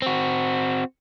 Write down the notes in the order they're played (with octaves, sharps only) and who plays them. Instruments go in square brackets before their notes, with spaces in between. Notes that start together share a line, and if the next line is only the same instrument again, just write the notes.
[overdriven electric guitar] C4 F#4